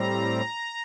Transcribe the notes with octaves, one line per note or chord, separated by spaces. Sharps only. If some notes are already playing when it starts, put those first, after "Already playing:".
Already playing: A2 G3 C4 A#5